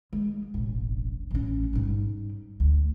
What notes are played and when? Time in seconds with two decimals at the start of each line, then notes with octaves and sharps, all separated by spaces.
0.13 G#3
0.54 E1 A1
1.31 A1 C#4
1.73 G#2 G3
2.60 D2